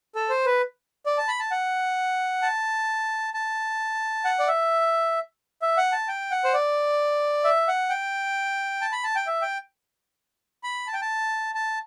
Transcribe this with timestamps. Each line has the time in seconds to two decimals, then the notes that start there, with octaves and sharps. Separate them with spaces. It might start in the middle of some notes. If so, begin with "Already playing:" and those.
0.15 A4
0.29 C5
0.46 B4
1.06 D5
1.18 A5
1.28 B5
1.40 A5
1.51 F#5
2.42 A5
3.34 A5
4.25 F#5
4.40 D5
4.48 E5
5.62 E5
5.77 F#5
5.92 A5
6.08 G5
6.31 F#5
6.44 C5
6.54 D5
7.44 E5
7.68 F#5
7.90 G5
8.81 A5
8.92 B5
9.04 A5
9.15 G5
9.27 E5
9.42 G5
10.64 B5
10.87 A5
10.93 G5
11.02 A5
11.55 A5